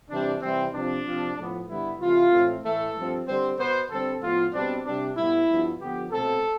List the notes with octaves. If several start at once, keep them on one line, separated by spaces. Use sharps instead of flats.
C3 E3 G3 C4 D4
C3 E3 G3 C4
C3 F3 C4 D4
C3 F3 C4
A2 F3 B3
G2 D3 G3 B3 E4
C3 E3 A3 F4
A2 E3 A3 C4
A2 E3 A3 A4
G2 F3 C4
D3 G3 C4 C5
B2 B3 C5
D3 G3 C4 A4
A2 F3 B3 F4
B2 G3 C4 D4
C3 G3 C4 D4
A2 G3 B3 E4
G2 F3 B3
D3 F3 B3 G4
B2 A3 C4 A4